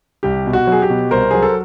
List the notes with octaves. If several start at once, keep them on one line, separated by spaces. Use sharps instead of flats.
C2 G4
B2
F#4
F#3 G#4
G4
B2
C2 A#4 C5
F#3 G#4
A4